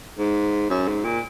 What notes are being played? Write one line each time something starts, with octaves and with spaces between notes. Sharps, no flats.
G#2
F#2
G#2
A#2